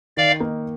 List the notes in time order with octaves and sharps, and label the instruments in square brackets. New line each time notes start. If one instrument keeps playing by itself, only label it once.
[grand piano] D#3 [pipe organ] D5 F5
[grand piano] A#3 D#4